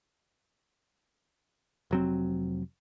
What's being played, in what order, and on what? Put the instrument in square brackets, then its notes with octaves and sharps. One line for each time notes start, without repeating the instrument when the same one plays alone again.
[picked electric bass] F1 F#3 C4